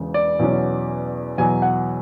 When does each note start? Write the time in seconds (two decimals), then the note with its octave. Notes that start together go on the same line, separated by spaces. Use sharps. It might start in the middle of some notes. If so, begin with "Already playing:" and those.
Already playing: E1 E2 C#3
0.14 D5
0.39 E2 B2 F#3 C#4
1.38 E2 B2 F#3 G#5
1.62 F#5